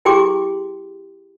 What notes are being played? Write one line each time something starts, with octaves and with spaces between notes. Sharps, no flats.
E4 G4 G#4 G5 C6 D6